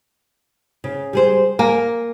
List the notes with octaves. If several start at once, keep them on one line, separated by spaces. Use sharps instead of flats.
C#3
G3 G#4 C5
A#3 G#5